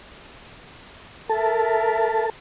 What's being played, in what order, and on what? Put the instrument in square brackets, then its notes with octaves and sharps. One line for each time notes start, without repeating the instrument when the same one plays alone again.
[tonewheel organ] A4 A5 [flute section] A#4 E5